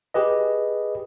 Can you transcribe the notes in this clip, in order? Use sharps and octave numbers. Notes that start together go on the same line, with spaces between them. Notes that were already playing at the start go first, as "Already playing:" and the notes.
G4 G#4 B4 D#5